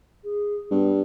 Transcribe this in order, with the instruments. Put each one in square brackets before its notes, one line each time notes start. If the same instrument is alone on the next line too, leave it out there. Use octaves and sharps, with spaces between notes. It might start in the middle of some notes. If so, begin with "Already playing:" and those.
[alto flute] G#4
[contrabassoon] G2 [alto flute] B3